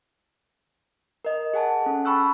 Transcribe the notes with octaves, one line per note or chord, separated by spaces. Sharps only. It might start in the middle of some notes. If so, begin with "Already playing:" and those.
A#4 D#5
G#4 F#5 G#5 A5
C#4 A4
G5 A5 B5 C#6 E6 F#6